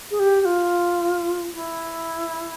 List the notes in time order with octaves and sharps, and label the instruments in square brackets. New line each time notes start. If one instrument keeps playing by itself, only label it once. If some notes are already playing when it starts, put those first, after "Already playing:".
[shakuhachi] G#4
G4
G4
F4
E4